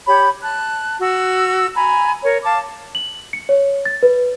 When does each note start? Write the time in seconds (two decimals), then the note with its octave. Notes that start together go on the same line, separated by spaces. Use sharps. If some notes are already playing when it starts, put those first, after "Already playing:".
0.07 G4 C#5 B5
0.43 A5 F#6
1.00 F#4 E6
1.75 G#5 A#5 B5
2.23 A#4 C#5
2.44 F5 A5 D6
2.95 F#7
3.33 C#7
3.49 C#5
3.85 A6
4.03 B4